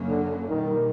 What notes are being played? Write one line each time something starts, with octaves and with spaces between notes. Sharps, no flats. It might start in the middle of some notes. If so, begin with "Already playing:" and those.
Already playing: F#2 C#3 F#3 A#3 C#4
D3
B1 A#2 D#3 G3